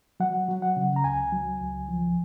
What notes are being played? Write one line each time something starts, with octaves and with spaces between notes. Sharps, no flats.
F#3 F#5
F#3
F#5
C#3
A#5
C#2 G#5
F#3
C#2
F3